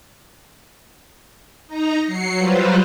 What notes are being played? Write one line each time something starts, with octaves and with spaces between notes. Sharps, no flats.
D#4 A#5
F#3 C7 C#7
F#3 G3 F4 B4 C5